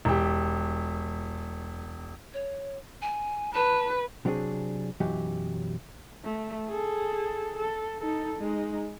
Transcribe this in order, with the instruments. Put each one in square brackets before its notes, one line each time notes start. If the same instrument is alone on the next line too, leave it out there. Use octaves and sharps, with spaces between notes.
[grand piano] E1 G4
[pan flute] C#5
G#5
[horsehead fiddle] B4 [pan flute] A5
[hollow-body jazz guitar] C3 F#3 C4 D4 E4 G#4
B1 F#2 E3 F#3 G4
[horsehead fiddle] A3
G#4 A4
A4
D#4 A4
G#3 D#4